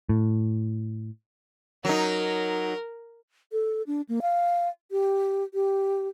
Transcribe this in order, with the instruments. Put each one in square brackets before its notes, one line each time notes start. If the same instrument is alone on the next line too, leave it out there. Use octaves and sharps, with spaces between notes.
[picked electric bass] A2
[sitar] F#3 D#4 [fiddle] A#4
[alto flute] A4
D4
A#3
F5
G4
G4